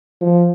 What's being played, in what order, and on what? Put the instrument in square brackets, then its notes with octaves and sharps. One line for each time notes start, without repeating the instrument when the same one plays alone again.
[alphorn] F3